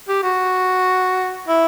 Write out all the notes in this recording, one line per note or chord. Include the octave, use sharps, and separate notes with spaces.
G4
F#4
E4